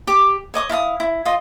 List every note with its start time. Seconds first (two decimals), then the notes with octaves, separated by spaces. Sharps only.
0.07 G4 D6
0.54 C#5 D#5 D6 D#6
0.69 E4 F5 A5 D#6
1.00 E4
1.25 F4 D#5